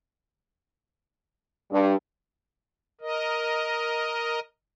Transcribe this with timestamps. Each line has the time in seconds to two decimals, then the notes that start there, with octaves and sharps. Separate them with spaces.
1.72 G2
3.01 A#4 D#5